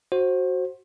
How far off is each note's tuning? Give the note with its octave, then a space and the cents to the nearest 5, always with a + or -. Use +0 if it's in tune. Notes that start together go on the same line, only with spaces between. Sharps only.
F#4 +0 C5 +20